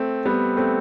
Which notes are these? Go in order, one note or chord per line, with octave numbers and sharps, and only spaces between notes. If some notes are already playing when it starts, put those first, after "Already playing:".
Already playing: A3 C4
G3 B3
A3 C4